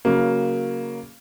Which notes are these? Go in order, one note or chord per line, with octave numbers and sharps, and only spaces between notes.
C#3 F#3 A#3